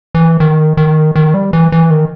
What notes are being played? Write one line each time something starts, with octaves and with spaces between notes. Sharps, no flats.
E3
D#3
D#3
D#3
G3
E3
E3
D#3